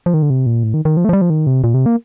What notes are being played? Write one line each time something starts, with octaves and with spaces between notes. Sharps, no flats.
F3
D#3
D3
C3
A#2
A2
D#3
D#3
F3
A3
F3
G3
F3
D#3
C3
A#2
C3
A#3